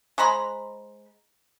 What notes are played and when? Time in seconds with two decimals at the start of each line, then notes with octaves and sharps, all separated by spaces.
0.18 G#3 C5 A#5 B5